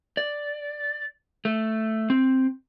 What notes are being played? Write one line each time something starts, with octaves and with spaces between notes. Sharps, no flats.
D5
A3
C4